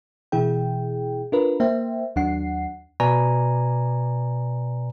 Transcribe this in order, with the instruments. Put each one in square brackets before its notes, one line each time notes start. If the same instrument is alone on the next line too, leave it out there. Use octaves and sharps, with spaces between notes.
[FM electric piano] B2 E3 E4 G#4 G5
D4 F4 A#4 B4
A#3 C5 E5 G5
D#2 F#3 D4 F#5 C7
[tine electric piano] B2 B4 D5 G#5 A#5